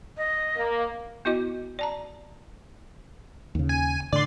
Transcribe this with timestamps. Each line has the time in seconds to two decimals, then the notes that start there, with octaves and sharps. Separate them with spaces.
0.17 D#5
0.56 A#3
1.25 B3 E4 F#4 D#5 D6
1.79 D5 A5 A#5
3.55 D#2 C#3
3.69 G#5
4.13 A2 D3 D5 C6